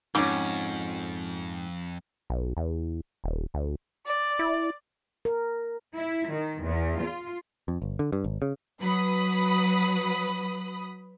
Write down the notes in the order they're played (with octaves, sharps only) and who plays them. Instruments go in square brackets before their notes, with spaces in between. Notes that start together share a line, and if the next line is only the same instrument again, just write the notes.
[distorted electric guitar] F2 [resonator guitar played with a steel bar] G#2 [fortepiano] C#4 D6
[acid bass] B1
E2
D#1
D2
[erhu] D5
[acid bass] E4
[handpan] A#4
[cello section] E4
D#3
E2
F4
[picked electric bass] F2
G1
D3
G2
G#1
C#3
[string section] F#3 B4 B5 D#6